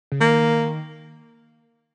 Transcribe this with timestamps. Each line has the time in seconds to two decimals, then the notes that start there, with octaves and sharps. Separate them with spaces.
0.12 C#3
0.21 D#3 A#3